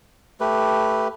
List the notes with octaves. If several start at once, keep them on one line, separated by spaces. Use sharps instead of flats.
A3 G4 B4